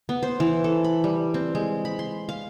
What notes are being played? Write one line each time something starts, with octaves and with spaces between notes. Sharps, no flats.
B3
C5
E3
A4
B5
G3
C4
G#3
B5
C6
F5